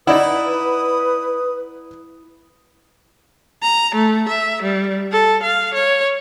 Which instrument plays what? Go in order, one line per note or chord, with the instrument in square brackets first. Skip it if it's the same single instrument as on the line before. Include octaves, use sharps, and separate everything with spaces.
[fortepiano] D#4 D5 F#5 [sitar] E4 [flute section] B4 [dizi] D#6
[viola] A#5
A3
E5
G3
A4
F5
C#5